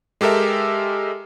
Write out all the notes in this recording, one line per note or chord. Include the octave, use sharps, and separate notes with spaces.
G#3 G4 A4 A#4 E5